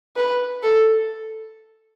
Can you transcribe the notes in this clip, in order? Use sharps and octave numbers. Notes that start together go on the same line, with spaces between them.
B4
A4